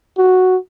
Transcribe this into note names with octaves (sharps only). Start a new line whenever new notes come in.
F#4